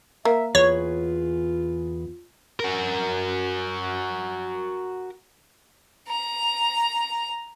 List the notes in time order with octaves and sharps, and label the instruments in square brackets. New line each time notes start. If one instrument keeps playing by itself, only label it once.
[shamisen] A#3 [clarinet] E5
[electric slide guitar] E2 G#4 B4 [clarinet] F4 [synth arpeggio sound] C#5
[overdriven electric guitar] F#4 A#4
[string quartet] A#5